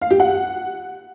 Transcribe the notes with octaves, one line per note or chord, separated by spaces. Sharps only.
F5
G4
F#5